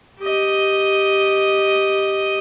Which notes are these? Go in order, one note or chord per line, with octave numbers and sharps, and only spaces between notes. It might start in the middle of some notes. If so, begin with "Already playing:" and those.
G4 D#5